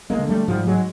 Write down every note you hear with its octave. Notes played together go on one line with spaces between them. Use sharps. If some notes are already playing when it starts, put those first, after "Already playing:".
G#3 A#3
D3
G3 A3
G#2 F3 G3
F#3 G#3